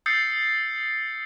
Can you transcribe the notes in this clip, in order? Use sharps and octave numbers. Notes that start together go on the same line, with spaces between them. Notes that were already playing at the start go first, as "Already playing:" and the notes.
D#6 E6 G6 A6 C7 C#7